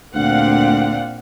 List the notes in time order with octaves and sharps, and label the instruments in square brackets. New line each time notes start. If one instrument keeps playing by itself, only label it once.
[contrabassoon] D2 [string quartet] A#2 C4 [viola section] D4 F5 F#5